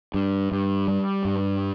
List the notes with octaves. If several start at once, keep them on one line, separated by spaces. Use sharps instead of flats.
G2
G2
G3
G2